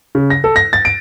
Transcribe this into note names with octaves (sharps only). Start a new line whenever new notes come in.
C#3
A#6
A4
A#6
A6
D7